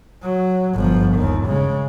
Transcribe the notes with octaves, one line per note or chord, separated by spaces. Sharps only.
F#3
G1 F3
D#2 D#3
C#3 G#3